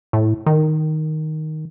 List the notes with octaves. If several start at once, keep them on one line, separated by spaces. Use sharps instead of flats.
A2
D#3